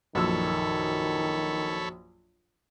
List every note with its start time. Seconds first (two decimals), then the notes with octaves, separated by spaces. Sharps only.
0.15 A#1 F#2 D#3 A4 C#5 B5 E6